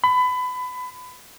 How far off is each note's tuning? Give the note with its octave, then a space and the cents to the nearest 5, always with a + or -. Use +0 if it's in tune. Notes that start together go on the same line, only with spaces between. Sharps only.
B5 +25